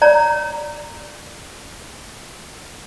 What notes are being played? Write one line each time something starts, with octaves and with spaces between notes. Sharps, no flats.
C#5 D5 A#5